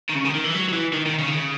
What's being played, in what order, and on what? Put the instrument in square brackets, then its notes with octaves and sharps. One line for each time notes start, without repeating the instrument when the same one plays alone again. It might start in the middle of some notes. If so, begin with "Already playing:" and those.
[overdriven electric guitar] D#3
C#3
D#3
D#3
E3
F#3
F#3
E3
D#3
D#3
C#3
D#3
C#3